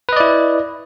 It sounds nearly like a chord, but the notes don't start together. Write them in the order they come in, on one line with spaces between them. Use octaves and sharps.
B4 D#5 D5 E4